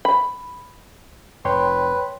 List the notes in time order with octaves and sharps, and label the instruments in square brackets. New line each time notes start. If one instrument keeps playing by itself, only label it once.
[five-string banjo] B5
[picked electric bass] F1 [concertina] B4 [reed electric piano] C#5 G5 C6